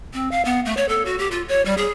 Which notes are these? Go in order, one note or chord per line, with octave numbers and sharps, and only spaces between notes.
C4
F5
B3
A3
C#5
A4
F#4
G4
F4
C#5
G3
G#4